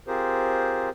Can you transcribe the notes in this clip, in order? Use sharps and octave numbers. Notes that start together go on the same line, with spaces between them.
C4 F4 G4 G#4 A#4 C5